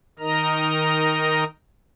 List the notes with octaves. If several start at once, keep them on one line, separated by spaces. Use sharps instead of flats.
D#3 D#4 A#4 D#5 A#5